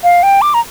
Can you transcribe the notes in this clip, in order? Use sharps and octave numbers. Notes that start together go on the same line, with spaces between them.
F5
G5
D6
A#5